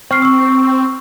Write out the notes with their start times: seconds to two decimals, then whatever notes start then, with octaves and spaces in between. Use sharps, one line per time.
0.11 C4 C#6 F6 C7
0.22 C#6 E6